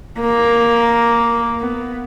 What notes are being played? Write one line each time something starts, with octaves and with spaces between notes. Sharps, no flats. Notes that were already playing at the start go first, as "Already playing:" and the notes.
A#3
B3